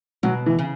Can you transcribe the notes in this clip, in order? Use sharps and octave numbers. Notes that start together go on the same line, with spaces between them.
B2 F#3
E3
C#3